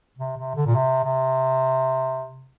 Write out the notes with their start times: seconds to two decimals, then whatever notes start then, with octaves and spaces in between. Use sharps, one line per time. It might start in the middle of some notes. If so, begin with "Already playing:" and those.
0.18 C3
0.37 C3
0.56 D3
0.66 A#2
0.75 C3
1.04 C3